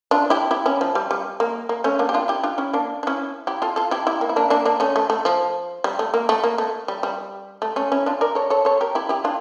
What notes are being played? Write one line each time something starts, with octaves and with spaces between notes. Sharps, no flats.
D4 F4
E4 G4
E4 G4
C#4 E4
F3
G3
G3
A#3
A#3
A3 C#4
A#3 D4
G4
D4 F4
E4 G4
D4 F4
C#4 E4
A#3 D4
D4
C#4 E4
E4 G4
F4 A4
F4 A4
E4 G4
E4 G4
A#3
E4
A#3 D4
A#3 D4
A#3 D4
A3 C#4
A3
A3
F3
G3
A3
A#3
A3
A#3
A3
G3
G3
A3
A3 C#4
C#4 E4
D4 F4
A#4 D5
A4 C#5
A4 C#5
A4 C#5
G4 A#4
E4 G4
E4 G4
D4 F4